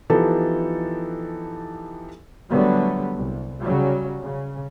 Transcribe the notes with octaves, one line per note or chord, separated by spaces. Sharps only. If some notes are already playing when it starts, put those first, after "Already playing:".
E3 F3 B3 D#4 G4 A4
D3 F#3 G3 A3 B3
C2
C#3 F#3 G3
C#3